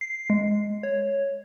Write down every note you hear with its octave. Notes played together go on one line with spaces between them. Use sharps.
C7
G#3
C#5